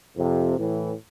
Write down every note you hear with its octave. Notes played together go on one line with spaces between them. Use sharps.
F2 C3
A2 E3